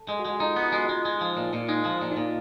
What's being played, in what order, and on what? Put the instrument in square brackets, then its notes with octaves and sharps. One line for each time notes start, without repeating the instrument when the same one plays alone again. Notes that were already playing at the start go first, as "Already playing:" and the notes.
Already playing: [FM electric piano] A4
[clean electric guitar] G#3
[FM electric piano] F#4
[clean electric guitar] G#3
[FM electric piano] F#4
[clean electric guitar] D#4 [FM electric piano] F4
[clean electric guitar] B3
[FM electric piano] E4
[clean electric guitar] G#3
[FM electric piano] D#4
[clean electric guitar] G#3
G#3
F3
A#2
A#2
[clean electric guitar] G#3 [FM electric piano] D#4
[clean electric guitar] F3
A#2
[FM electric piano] D#4
[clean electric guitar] A#2